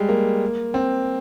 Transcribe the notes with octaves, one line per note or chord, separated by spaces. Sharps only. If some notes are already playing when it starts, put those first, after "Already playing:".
Already playing: G3 G#3
A#3
C4